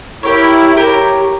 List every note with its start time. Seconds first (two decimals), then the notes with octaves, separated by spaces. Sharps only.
0.23 E4 G4 A#4 C#5
0.77 G4 A#4 C#5